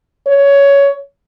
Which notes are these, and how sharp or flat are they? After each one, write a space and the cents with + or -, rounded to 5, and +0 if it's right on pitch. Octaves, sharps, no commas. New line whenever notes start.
C#5 +15